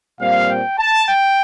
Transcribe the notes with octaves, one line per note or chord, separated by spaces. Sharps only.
A#2 G3 C4 F5
G5
A5
G5